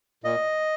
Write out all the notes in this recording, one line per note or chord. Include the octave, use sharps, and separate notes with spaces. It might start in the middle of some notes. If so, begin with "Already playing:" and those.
A#2 D#5